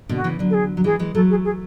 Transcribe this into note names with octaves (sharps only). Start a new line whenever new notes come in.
B2 D3
F#4
C#3 E3
D3 F#3
A4
G#4
F#3
E3 G#3 G#4
E3 G#3
F#3 A3 A4
G#4
G#4